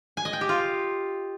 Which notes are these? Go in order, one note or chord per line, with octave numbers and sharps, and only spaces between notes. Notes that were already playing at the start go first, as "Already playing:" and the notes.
G#5
D#5
G5
G4
F4